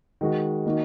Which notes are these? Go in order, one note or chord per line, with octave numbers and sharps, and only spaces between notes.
D#3 G#3 F#4
D#3 A#3 D#4 F#4